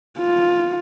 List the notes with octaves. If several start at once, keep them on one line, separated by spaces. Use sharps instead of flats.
F4